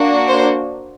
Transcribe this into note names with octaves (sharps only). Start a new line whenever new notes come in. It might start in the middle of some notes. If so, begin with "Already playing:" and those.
Already playing: A#3 D4 F#4
C5